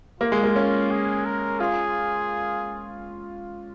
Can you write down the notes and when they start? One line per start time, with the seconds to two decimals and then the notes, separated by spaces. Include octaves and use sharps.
0.20 A#3 F4
0.32 G#3
0.44 A#3
0.56 C#4
0.91 G#4
1.25 A#4
1.60 F4 G#4